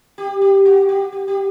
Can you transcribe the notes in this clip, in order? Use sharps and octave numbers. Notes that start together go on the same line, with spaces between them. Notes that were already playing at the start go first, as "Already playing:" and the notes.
G4
G4
F#4
G4
G4
G4